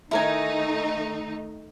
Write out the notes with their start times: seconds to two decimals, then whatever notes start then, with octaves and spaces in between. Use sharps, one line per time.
0.11 D#3 A3 D#4 E4 A#4 G#5